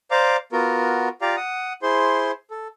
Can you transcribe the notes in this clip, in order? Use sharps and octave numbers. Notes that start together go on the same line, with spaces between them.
C5 D5 F5 A#5 D6
B3 F4 F#4 A#4
F4 G4 D5 F5 A#5
F#5 D#6
E4 G#4 C5 C6
A4